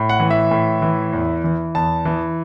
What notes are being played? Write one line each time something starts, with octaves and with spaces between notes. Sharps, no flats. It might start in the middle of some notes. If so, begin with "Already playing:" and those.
Already playing: A2
F#5
E3
E5
A2
E3
E2
E3
E2 A5
E3